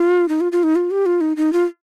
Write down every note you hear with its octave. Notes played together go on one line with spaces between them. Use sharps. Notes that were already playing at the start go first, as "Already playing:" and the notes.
Already playing: F4
D#4
F4
F4
D#4
F4
G4
F4
D#4
D#4
F4